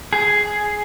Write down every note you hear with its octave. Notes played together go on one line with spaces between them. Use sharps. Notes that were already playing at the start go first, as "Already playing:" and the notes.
G#4